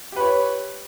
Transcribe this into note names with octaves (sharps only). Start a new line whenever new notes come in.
G4 B4 C#5